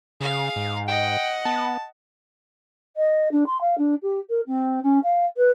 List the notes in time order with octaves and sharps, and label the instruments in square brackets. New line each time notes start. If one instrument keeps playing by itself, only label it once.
[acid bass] C#3 [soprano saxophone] G#4 [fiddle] F5
[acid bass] G#2
[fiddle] D#5 F#5 [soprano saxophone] G5
[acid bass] B3 [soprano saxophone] A5
[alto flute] D#5
D4
C6
F5
D4
G4
A#4
C4
C#4
F5
B4